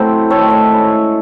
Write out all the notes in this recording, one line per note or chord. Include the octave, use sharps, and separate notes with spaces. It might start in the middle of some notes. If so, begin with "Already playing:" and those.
Already playing: F#3 A3 C4 E4 C5
D#3 A3 C4 A4 C#5
C#5 E5
A2 G#3 C#4 E4